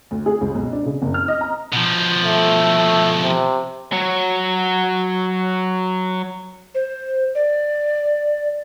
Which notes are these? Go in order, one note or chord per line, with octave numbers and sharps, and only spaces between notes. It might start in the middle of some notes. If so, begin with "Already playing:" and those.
D2
G#4
C#2
B1
D4
C#3
F#1
F6
D#5
A#5
B2 F3
A3
C3
F#3 C#5
C5
D5